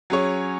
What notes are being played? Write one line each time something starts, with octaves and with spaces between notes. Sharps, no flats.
F#3 C#4 G#4 C#5